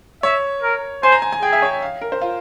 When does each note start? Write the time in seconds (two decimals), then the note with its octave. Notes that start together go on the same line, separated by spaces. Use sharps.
0.23 C#5 E5
0.62 A#4
1.03 C5 G#5
1.12 A#5
1.22 G#5
1.32 G#5
1.42 G#4 G5
1.53 E5
1.62 C#5
1.82 F5
2.01 A#4
2.12 C5
2.21 F4